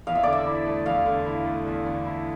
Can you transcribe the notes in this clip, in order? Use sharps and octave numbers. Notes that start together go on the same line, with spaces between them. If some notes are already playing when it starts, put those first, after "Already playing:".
E2 F5
E5
D3 D5
E5
E4
A3
E2 F5
D3
E4
A3
E2
D3
E4